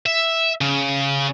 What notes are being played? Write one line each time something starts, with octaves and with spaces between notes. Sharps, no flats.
E5
C#3